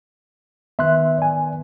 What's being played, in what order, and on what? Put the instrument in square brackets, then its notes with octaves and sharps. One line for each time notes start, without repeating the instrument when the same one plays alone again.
[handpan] D#3 B3 [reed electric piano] E5 C6 F#6
[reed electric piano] D5 G#5